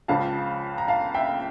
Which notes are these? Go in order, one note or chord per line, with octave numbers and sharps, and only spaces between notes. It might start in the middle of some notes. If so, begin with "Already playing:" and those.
C#2 C#3 F3 F5 A5
A#5
F5 A5
E5 G5